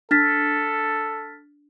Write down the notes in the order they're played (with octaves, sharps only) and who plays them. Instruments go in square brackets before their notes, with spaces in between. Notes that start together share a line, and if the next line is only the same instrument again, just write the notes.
[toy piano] D4 [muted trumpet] A4 [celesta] F6 A6 B6